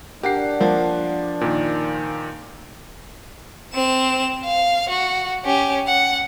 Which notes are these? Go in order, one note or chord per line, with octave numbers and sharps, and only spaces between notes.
D4 G4 A#4 F#5 C7
F3 A#3
A#2 D#3
C4 E7
F5
F#4
C#4 G4
F#5